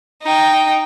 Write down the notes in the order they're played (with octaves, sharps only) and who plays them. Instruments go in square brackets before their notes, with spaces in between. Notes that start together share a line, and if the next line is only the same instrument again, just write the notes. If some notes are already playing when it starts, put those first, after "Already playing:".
[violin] D#4 G5